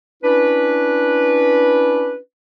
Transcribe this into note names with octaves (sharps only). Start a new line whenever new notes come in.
C#4 D4 E4 B4